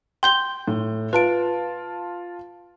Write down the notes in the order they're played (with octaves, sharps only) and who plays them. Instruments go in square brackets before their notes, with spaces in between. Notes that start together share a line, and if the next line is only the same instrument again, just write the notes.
[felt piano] G5 [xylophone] C6 G6 G7
[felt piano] A2
[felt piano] F4 A5 [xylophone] B4 D7